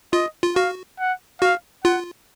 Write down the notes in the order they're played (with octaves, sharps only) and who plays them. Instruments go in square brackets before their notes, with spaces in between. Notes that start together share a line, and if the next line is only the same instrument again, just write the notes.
[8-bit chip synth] F4 [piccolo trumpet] D#5
[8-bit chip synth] F4
[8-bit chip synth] F#4 [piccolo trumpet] F5
[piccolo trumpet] F#5
[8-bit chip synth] F#4 [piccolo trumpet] F5
[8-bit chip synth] F4 [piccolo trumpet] F#5